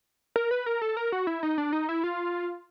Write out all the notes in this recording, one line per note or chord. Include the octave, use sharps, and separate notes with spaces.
A#4
B4
A#4
A4
A#4
F#4
E4
D#4
D4
D#4
E4
F4